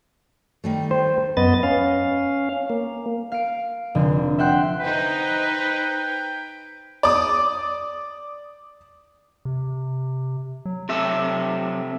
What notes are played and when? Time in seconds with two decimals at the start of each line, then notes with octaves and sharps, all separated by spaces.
0.64 D#3 G3 A3
0.91 C5
1.37 F#2 B3 B4 D#5 A6
1.63 C#4 F5
2.70 A#3
3.32 F5 D7
3.95 F1 D3
4.38 E5 F#5 G5 C6 F#6 G6
4.80 D#4 B4 C5 G5
7.03 D5 D6 D#6
9.45 C3
10.66 F#3
10.89 C3 A3 E5